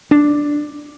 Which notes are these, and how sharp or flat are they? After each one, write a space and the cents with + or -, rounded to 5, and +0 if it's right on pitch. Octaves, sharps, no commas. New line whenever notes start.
D4 +5